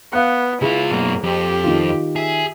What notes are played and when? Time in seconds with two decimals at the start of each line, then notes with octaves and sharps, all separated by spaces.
0.13 B3 F5 F#6
0.62 C#2 E4 F4 G#4
0.91 F#2 B2 A#3
1.24 F2 G4
1.64 D#3 F4
2.16 G#4 E5